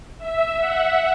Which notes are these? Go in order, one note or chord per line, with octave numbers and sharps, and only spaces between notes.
E5
F#5